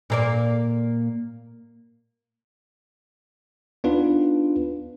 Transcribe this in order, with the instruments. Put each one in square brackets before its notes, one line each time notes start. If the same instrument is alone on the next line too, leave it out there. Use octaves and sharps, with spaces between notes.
[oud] A#2 A#3 D5
[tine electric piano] B3 D4 D#4 F4 B4